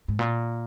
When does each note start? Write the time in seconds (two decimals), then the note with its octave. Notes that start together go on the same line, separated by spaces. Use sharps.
0.08 G#2
0.19 A#2